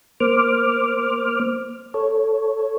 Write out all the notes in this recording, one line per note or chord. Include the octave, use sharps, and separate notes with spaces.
A#3 C5 D6 F6
A4 C#5